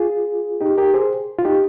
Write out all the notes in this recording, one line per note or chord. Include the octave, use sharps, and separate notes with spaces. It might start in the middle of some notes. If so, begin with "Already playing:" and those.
Already playing: F4 G#4
D#4 G4
G4 A#4
G#4 C5
F4
D#4 G4